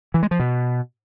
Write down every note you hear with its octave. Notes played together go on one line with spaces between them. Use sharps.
E3
G#3
F3
B2